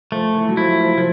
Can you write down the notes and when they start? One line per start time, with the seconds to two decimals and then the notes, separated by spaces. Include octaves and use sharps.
0.12 F3 A3
0.34 E3
0.49 F#3
0.57 F3 E4
0.80 F3
0.98 F3